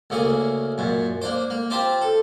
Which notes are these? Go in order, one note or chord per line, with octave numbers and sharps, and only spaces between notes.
D2 C#3 A#3 G#4
F#2 A#2
A#3 D4 C5
A#3
C4 F4 G4 C5 A5
A4